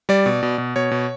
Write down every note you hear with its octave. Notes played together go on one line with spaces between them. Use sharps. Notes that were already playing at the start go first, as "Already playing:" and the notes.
G3 D5
B2
B2
B2
B2 C#5
B2